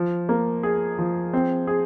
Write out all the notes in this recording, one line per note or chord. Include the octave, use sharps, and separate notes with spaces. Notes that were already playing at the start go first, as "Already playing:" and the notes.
Already playing: F3
A#3
G#4
F3
C4
G#4